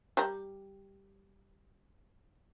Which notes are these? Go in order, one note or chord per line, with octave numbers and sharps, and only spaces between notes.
G3 G4 A#5